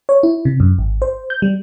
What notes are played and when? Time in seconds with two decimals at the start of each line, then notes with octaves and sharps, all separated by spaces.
0.09 C#5
0.23 E4
0.45 C3
0.60 F#2
0.78 G#1
1.02 C5
1.30 G6
1.42 G3